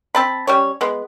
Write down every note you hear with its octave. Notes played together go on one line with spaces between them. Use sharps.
C4 A5 B5
G3 C#4 C#5
G#3 B3